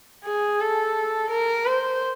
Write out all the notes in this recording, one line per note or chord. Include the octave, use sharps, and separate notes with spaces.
G#4
A4
A#4
C5